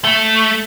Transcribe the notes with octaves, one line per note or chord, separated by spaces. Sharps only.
A3